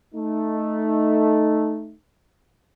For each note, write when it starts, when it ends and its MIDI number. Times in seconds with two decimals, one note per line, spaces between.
0.15 1.94 57
0.15 1.94 63